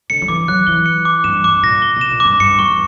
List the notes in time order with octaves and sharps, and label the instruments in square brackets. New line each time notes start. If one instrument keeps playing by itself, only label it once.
[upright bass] D3 [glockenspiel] C#7
[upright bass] F#3
[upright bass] E3 [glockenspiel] D6
[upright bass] F#3 [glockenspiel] F#6
[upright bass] E3 [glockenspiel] G7
[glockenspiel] C#7
D6
[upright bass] G2 [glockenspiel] E7
[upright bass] G2 [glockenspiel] D6
[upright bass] A#2 [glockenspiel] A#6
[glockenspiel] G7
[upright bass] B2 [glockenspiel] E7
[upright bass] A#2
[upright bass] G2 [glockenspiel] D6
[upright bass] G2 [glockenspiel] C#7
[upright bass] E2 [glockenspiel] C#6